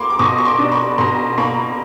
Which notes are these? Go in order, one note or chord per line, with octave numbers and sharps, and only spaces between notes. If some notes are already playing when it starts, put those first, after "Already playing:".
Already playing: A#3 B5 C6 D6
D6
B2 C#6 D#6
C#6
C6 D6
D4
B5 C#6
B2 A#5 C6
A#3 B5 C#6